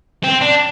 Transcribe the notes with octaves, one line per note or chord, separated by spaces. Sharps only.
C4
D4